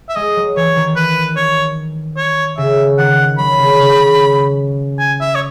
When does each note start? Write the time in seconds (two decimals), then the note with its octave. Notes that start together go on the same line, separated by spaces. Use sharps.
0.09 E5
0.15 G#3 D#5
0.36 F#3
0.56 E3 C#5
0.76 D#3
0.96 B4
1.37 C#5
2.17 C#5
2.58 C#3 E5
2.98 D#3 F#5
3.38 F#3 B5
3.59 C#3
3.79 C#3
4.00 C#3
4.99 G#5
5.21 E5
5.35 C#5